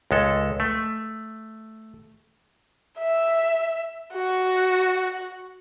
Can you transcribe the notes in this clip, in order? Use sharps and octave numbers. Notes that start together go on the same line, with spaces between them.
C#2 G#3 A4
A3
E5
F#4